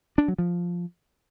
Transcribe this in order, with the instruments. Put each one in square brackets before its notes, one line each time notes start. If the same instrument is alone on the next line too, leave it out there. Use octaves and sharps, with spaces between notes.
[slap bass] D4
F#3
F3